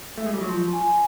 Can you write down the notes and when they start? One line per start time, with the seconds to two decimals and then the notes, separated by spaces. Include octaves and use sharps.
0.18 A3
0.26 G#3
0.34 G3
0.41 F#3
0.49 F3 C6
0.73 G#5